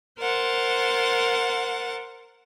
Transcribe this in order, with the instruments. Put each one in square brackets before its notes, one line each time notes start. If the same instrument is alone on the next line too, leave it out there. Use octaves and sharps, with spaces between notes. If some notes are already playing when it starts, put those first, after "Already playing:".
[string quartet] A#4 C5 F#5 A6